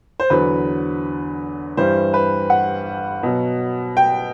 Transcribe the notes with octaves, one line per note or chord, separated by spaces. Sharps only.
C5
E2 D3 F#3 B4
G2 E3 G3 C5
B4
F#5
B2 F#3
G5